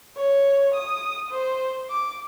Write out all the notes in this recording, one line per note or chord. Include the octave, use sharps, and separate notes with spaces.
C#5
D#6
C5
D6